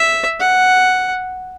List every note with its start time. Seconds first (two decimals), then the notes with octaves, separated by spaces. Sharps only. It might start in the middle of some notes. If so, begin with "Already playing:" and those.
Already playing: E5
0.40 F#5